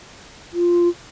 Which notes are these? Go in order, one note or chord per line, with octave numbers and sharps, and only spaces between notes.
F4